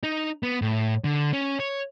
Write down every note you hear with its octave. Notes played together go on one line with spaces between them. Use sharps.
D#4
B3
A2
D3
C#4
C#5